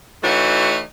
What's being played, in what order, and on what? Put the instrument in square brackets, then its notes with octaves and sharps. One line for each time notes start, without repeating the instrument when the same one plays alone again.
[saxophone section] E3 A3 D#4 F#4 C#5